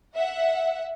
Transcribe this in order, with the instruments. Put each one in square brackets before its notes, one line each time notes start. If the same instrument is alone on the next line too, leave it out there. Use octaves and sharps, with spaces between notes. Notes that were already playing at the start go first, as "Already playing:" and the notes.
[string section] E5 F#5